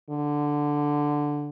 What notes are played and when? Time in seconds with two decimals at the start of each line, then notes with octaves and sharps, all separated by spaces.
0.10 D3